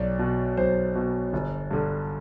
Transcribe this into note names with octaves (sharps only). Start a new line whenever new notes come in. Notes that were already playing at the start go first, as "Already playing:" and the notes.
Already playing: B1 D5
B2
B1 C5
B2
G1
G2 D3